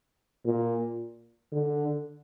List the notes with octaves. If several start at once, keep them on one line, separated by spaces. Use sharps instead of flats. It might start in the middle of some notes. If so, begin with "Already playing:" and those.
A#2
D3